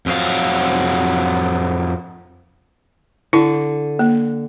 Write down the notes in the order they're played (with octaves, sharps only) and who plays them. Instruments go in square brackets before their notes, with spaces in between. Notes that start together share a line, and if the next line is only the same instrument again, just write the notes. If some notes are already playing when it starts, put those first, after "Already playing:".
[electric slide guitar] F2 F#3 F5
[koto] D3 [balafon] E4
[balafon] A#3